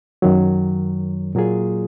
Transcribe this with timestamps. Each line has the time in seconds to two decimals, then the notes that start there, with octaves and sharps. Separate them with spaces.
0.22 F#2 D#3 F#3
1.35 A#2 F#3 A#3 F4 G#4